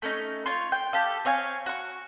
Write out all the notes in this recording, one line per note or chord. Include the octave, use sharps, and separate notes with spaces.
A3 C#4 D#4
F4 C#5 C6
G5
G4 A4 F5
C4 C#5 F5 G#5
F#4 C#6